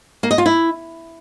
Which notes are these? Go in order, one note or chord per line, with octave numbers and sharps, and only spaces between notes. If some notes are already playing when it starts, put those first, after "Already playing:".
A#3
D#5
F4
E4